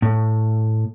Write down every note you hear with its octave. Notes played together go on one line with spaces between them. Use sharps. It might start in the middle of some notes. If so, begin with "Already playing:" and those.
A2